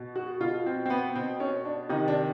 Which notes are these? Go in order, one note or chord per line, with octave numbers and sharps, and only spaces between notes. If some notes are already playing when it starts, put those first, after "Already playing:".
Already playing: B2
F#4
B2 F4
C4
C4
B3
B2 C4
C#4
D4
C3 D#3 D#4
D4